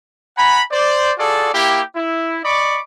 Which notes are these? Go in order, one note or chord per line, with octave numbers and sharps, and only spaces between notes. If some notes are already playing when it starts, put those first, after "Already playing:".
F#5 G#5 A#5 B5
C5 D5
F4 F#4 G#4 A4 D5
A#3 E4 G4
E4
D5 D#5 B5 C#6 D6